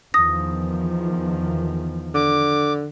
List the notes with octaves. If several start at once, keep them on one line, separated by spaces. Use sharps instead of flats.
E2 D#3 F3 D#6 A#6
D3 D6